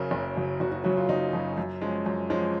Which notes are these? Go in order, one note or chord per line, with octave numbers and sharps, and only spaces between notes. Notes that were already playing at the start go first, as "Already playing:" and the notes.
Already playing: F#1 F#2 C#3 F#3 A#4
F#1
F#2 C#3 F#3
F#1 F#4
F#4
F#2 C#3 F#3 F#4
F4
F#1 D#4
F#2 C#3 F#3
F#2
F3 G#3 C#4
F#2
F3 G#3 C#4